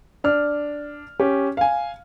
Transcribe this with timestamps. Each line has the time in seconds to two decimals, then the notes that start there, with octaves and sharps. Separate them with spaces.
0.24 D4 F6
1.20 C#4 G4
1.57 F5 G#5